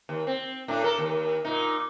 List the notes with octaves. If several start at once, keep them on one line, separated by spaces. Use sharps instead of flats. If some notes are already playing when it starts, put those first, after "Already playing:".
D#2
C4
A2 D4
A4 A#4
D#2
A#2 D#4